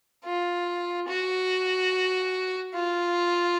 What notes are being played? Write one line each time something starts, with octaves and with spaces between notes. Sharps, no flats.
F4
F#4
F4